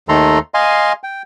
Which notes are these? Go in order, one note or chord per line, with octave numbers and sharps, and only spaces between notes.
D#2 D#3 A3 A4 A#5 C6
D#5 F5 G#5 C6
G5